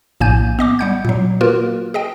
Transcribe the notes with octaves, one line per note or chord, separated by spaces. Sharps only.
A#1 A2 A#3 G#5 G6
B3 D#5 D6
G3 F#5 G6
A#2 F#3
A#3 F4 F#4 A#4 B4
G#4 D#5 G5